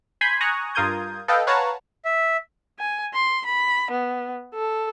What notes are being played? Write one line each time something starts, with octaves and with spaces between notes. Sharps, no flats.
G#5 B5 C6 G6 G#6 B6
G#5 A#5 C#6 D#6 F#6
G2 F4 A#4 D#6 G6 G#6
A4 B4 D#5 F5 G5
B4 C#5 F5 F#5 A5 A#5
E5
G#5
C6
B5
B3
A4